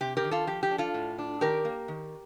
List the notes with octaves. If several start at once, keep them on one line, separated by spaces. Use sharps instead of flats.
C3 G4
G4 A#4
D#3
F4 A4
F3 G4
G4
D4
F4 A4
A2
D4
D#3 G4 A#4
A#3
D#3